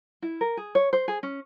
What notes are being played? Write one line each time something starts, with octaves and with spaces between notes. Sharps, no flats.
E4
A#4
G#4
C#5
C5
G#4
C#4